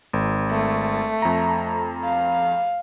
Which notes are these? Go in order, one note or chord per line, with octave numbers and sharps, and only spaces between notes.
G#1
A3
F2 A#5
F5